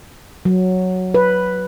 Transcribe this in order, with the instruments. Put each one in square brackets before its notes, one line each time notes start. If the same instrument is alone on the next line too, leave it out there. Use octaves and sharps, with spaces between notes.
[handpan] F#3
B4